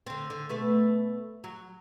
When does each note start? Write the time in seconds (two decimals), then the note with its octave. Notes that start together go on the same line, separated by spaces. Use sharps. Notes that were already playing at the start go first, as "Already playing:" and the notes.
0.07 D3 C4
0.30 D3
0.49 B2 A3 B4
1.44 F#3